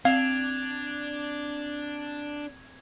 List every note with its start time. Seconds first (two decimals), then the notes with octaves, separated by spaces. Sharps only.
0.05 C4 D4 F5 G#6 F7